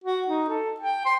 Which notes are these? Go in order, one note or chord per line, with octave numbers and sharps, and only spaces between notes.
F#4
D#4
A4
G5
C6